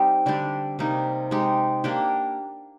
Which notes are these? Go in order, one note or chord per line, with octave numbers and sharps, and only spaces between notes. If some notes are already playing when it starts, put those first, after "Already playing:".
Already playing: G3 C4 D#4 G4
D3 G3 D4 G4
C3 G3 A#3 D#4
G#3 D#4 G4
A#3 D4 G4